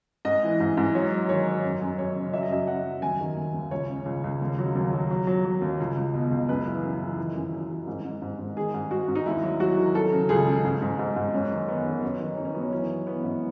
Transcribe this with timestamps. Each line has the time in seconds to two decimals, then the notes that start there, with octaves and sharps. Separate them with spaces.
0.25 G#2 D#5
0.43 E3
0.60 G#2
0.77 G#2
0.94 F#3 C#5
1.12 F#3
1.29 D#3 C#5
1.47 F#3
1.64 F#2
1.81 F#2
1.98 F#2 C#5
2.16 C#3
2.33 F#3 E5
2.43 D#5
2.50 F#2 E5
2.67 F#2 F#5
2.86 F#3
3.02 D#2 G#5
3.20 D#3
3.37 D#2
3.54 D#2
3.71 C#2 C#5
3.89 C#3
4.06 C#2
4.24 C#2
4.41 D#2
4.58 F#3
4.75 D#2
4.93 F#3
5.10 F#3
5.27 F#3
5.44 F#3
5.61 D#2
5.80 C#2
5.97 C#2
6.14 B2
6.31 C#2
6.48 F#2 B4
6.66 E3
6.84 F#2
7.01 E3
7.18 D#3
7.35 F#2
7.52 F#3
7.70 D#3
7.87 G#2
8.05 G#2
8.22 G#2
8.39 G#2
8.56 D#3 G#4
8.74 G#2
8.91 G#2 F#4
9.08 G#2
9.15 D#4
9.26 D#2 E4
9.43 F#3
9.60 F#3 F#4
9.77 D#3
9.95 F#3 A4
10.12 C#3
10.29 C#2 G#4
10.47 C#3
10.64 G#2
10.81 G#2
10.99 G#2
11.16 G#2
11.33 F#2 C#4
11.51 D#3
11.68 D#3 B3
11.86 D#3
12.02 F#2 C#4
12.20 D#3
12.37 F#2 D#4
12.45 C#4
12.54 F#3 B3
12.61 C#4
12.72 E3 C#4
12.90 E3
13.07 E3 B3
13.23 G#2